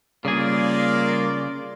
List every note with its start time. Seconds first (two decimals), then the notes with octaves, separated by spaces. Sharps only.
0.25 C#3 G3 A#3 F4 G#4 D5